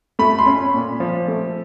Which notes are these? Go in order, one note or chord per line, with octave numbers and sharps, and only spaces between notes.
A3 B5
C6
C#4 B5
A#2
F3
A3